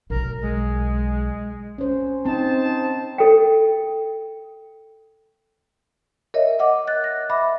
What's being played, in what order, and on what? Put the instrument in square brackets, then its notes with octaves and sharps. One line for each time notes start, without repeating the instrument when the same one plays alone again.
[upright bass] B1 [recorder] A#4
[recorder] G#3
[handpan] C#4 C5
[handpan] C4 [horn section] D#4 C5 A5
[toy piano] A4 G5
[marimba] A#4 C#5 D#5 E5
D#5 F#5 D6
F#6 A6
A#6
E5 B5 D6